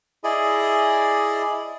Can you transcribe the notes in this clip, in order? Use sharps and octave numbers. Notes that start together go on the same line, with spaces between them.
E4 G#4 D5 D#5